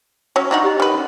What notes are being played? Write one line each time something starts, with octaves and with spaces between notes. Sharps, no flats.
F#3 C#4 A5 C#6
D4 D#4 F#4 C5 G5 B5
G4 C#5 D#5
D#3 B4
C#4 A#4